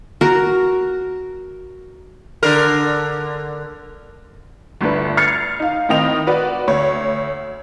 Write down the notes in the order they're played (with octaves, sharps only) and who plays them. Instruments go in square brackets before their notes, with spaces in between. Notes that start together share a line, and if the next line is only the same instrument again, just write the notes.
[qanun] F#4 A#4
[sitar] D3 A#4
[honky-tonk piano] G1 D2 D4 B4
F6 G#6 A6 C7 C#7
D#4 F5
A2 D#3 C4 D#5 G5 F7
F#4 B4 D5
D2 C#5